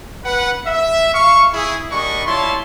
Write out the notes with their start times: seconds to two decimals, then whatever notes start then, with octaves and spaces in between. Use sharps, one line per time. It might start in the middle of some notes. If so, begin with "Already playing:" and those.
0.24 B4 F#5
0.66 E5
1.14 F5 C#6
1.54 E4 G#4
1.91 A#3 D4 G4 D#5 B5 C#6
2.26 G3 E4 F4 C#5 A5 C6